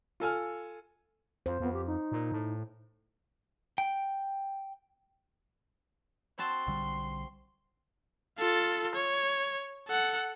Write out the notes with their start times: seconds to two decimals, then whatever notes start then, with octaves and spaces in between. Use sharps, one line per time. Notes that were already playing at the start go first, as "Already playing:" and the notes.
0.20 F4 A4 G#5 F6
1.46 F2 C5
1.60 F2 B3
1.73 G4
1.87 D#4
2.12 A#2
2.32 A2
3.78 G5
6.38 C4 F#4 A5 C6
6.67 B1 D3 G3
8.38 F4 A4
8.95 C#5
9.88 A4 F#5